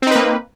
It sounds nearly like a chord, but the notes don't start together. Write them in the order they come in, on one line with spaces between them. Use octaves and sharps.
C4 D#4 B4 A#3